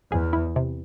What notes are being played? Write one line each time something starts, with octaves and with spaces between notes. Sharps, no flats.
E2 G#4
E4
C3